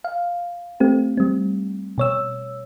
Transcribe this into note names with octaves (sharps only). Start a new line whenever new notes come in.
F5
A3 C4 G4
G3 C4
B2 C#5 E6